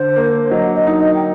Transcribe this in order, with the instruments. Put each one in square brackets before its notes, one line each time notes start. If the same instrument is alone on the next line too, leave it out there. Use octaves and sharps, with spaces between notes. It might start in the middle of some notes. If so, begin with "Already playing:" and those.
Already playing: [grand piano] D3 [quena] C5
[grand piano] A#3
[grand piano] F#3 [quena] D#5
[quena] D#5
[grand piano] D#4
[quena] D#5
G5